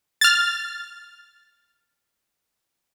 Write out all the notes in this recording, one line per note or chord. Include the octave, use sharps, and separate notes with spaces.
F6 A6